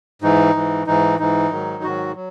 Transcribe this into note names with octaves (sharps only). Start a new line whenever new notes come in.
G#2 E3 D#4
G#2 E3
G#2 E3 D#4
G#2 E3 D#4
G#2 D#3 F#3
G#2 D#3 F#3 F#4
F#3